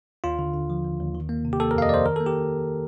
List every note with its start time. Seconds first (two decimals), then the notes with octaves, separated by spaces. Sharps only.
0.24 D#2 F4
0.39 D3
0.54 D3
0.70 F3
0.85 D#2
0.99 D#2
1.15 D#3
1.29 A#3
1.45 C3
1.53 G4
1.60 A#3 A4
1.71 A#4
1.75 F2 F5
1.82 D#5
1.89 F2 C5 D5
2.05 D#3 A#4
2.16 A#3 A4
2.26 G4